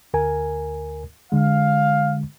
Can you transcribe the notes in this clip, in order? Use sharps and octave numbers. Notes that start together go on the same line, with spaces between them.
D2 A#4 G#5
D3 G#3 F5